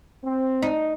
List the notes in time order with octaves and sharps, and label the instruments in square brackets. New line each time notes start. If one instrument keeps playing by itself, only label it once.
[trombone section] C4
[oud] D#4